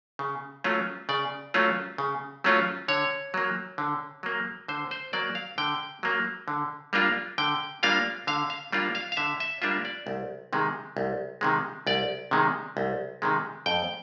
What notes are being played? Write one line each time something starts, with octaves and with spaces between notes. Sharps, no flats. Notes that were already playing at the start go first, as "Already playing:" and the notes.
C#3
F#3 A3 C#4 F4
C#3 D5
F#3 A3 C#4 F4
C#3
F#3 A3 C#4 F4
D3 C#5
F#3 A#3
D3
F#3 A#3
D3 C5
C5
F#3 A#3 D5
F5
D3 G5
F#3 A#3
D3
G3 A#3 D4 F4
D3 G5
G3 A#3 D4 F4 F5
D3 F5
F5
G3 A#3 D4 F4
F5
F5
D3 E5
E5
G3 A#3 D4 F4 E5
D5
C2
C3 D#3 G#3
C2
C3 D#3 G#3
C2 D5
C3 D#3 G#3
C2
C3 D#3 G#3
F2 G5